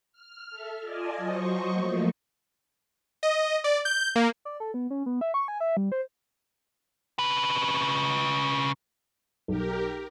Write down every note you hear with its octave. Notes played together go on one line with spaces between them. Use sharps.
F6
A4 E5
F4 D5 D#5 G#5 A5
F#3 C5 D#5 C#6
F3 A3 A#3
D#5
D5
G6
A#3
D5
A4
B3
C#4
B3
E5
C#6
G#5
E5
G3
C5
C#3 B4
B1 G4 A#4